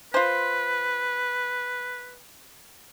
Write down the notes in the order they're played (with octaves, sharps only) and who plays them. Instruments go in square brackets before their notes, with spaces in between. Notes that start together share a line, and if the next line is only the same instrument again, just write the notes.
[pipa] F4 C5 [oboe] B4